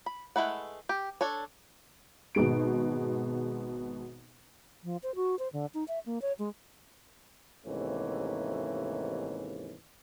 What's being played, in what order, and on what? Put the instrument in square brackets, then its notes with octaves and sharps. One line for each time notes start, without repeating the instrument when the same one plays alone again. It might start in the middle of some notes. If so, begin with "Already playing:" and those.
[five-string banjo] B5
G#3 A3 E4 B4 F#5
G4
D4 A4 C#5
[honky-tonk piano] G#1 B2 G#3 D7
[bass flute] F3
C5
F#4
C5
D3
D#4
E5
A#3
C#5
G#3
[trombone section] D#2 G#2 C3 E3 A3 C#4